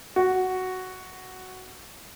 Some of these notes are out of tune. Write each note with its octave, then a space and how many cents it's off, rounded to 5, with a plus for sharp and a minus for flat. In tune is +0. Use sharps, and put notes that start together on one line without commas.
F#4 +5